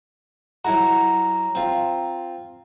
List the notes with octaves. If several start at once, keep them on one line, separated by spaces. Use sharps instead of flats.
F#3 E4 F#4 A#5
C4 F4